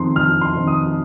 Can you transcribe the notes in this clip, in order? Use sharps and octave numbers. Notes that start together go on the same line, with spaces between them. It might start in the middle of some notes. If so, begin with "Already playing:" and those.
Already playing: F2 D#3 C4 D#4 C6
F2 F6
C6
D#3 C4 D#4
D#6